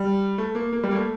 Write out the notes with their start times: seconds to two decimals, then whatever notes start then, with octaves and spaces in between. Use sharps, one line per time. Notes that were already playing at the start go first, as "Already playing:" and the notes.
Already playing: G3
0.38 A3
0.55 A#3
0.73 A#3
0.84 G3
0.91 A#3
0.95 A3